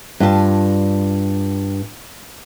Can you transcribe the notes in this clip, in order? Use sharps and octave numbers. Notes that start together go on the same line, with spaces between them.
G2 F4 G4 A5